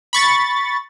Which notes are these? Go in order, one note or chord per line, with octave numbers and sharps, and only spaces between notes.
B5 C#6 A6